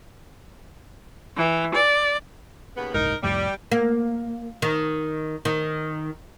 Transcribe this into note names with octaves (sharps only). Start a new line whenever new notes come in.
E3
D5
D#2 C#3 B3
F#1 C2 G#2 D#4 A#4
C2 F2 A2 G3
A#3
D#3
D#3